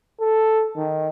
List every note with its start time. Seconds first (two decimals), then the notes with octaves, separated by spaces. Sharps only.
0.20 A4
0.76 D#3